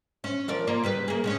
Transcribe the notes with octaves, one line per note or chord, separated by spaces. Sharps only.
C#4
F3 A#4 D5
A#3 F4 D5
C#3 G3 B4
A#3 G#4
C#3 G#3 C#4